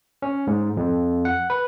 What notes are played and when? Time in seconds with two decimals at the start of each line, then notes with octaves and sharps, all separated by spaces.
0.22 C#4
0.47 G#2
0.77 F2
1.25 F#5
1.50 B4